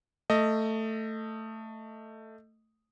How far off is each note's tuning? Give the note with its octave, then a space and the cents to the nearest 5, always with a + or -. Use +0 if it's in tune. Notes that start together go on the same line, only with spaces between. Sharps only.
A3 +10 D#5 +0